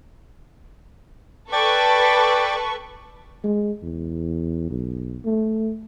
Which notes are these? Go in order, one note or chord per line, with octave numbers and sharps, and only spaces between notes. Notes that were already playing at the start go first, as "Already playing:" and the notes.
A4 B4 D5 G5 C#6 D6
G#3
E2
B1
A3